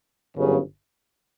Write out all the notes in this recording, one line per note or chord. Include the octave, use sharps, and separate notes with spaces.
G1 F#2 C#3